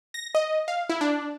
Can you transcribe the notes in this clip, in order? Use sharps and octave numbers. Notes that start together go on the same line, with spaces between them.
A#6
D#5
F5
E4
D4